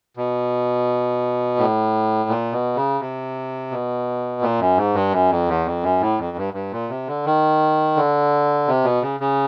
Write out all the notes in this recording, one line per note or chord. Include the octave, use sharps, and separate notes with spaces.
B2
A2
A#2
B2
C#3
C3
B2
A#2
F#2
G#2
G2
F#2
F2
E2
F2
F#2
A2
F2
G2
G2
A#2
C3
D3
D#3
D3
C3
B2
C#3
C#3